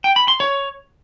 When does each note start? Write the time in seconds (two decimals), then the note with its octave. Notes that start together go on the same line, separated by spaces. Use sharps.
0.04 G5
0.16 B5
0.28 C6
0.40 C#5